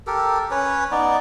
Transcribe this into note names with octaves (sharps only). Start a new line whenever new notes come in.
G4 A4 A#4
C#4 B4 C#5
B3 D#4 D5